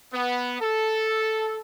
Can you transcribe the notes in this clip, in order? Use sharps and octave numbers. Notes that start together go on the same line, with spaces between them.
B3
A4